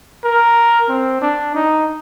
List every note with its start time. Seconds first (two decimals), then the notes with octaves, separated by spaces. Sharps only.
0.24 A#4
0.89 C4
1.21 D4
1.55 D#4